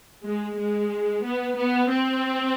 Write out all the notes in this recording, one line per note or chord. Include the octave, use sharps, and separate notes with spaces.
G#3
G#3
B3
B3
C4